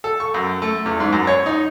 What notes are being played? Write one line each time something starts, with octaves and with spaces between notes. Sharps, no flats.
A4
C#6
F#2
A3
E2
G#2
F#2
C#5
D#4